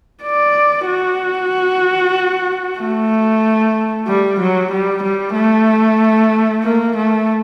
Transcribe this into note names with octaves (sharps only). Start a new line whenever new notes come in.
D5
F#4
A3
G3
F#3
G3
G3
A3
A#3
A3